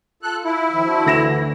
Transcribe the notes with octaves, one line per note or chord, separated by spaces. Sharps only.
F4 A4 F#6
E4
D#3 F3
D4 F#4 C5
D2 D3 E3 A#6 E7